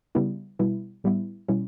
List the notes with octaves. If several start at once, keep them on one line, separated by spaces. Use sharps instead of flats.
C#3 G3 B3 E4
B2 G3 B3 E4
A2 G3 B3 E4
B2 G3 C#4 E4